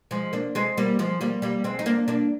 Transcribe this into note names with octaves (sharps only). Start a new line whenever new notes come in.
F3 G#3
A#3 D4
G#3 C4
G3 A#3
F3 G#3
G3 A#3
G3 A#3
G#3 C4
D#4
A#3 D4
A#3 D4